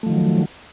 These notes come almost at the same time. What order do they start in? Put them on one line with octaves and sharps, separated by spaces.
A3 F3 D#3 F#3